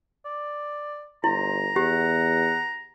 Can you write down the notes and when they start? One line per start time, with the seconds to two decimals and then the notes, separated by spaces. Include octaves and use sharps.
0.25 D5
1.24 G1 E4 C5 A#5
1.76 E2 G4 F#5